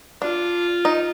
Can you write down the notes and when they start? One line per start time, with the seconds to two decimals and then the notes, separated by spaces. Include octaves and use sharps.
0.22 D4 F4
0.85 D#4